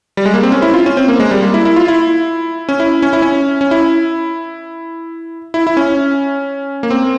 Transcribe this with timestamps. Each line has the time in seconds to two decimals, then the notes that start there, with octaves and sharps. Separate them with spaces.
0.17 G3
0.26 G#3
0.34 A#3
0.43 C4
0.52 C#4
0.62 E4
0.74 F4
0.86 C#4
0.97 C4
1.08 A#3
1.20 G#3
1.31 G3
1.43 A#3
1.54 E4
1.65 E4
1.76 F4
1.88 E4
2.69 C#4
2.80 E4
3.02 C#4
3.13 E4
3.22 C#4
3.61 C#4
3.71 E4
5.54 E4
5.67 E4
5.77 C#4
6.83 A#3
6.90 C4